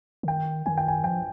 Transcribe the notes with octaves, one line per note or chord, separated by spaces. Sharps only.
D3
D#3 G5
D#3 G#5
G5
G#5
F3 G5